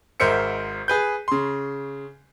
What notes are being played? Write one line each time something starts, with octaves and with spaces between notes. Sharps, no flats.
G#1 G#2 A#4 C5 E5 C#7
G#4 B4 G6
C#3 C6